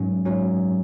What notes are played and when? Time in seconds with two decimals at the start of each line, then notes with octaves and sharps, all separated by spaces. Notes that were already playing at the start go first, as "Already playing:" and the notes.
Already playing: G#2 F#3 C#4
0.25 G#2 F#3 C#4